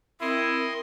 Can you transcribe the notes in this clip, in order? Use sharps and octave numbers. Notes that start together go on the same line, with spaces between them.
C4 E4 A#4 D#5 C6 D#6